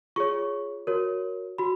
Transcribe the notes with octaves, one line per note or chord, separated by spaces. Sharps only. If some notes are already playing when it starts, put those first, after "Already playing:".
F4 G#4 C#5 C#6
F#4 A#4 C#5
F#4 B5